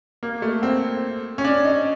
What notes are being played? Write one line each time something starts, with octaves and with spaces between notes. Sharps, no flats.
A#3
A3
C4
C#4
D4
D#4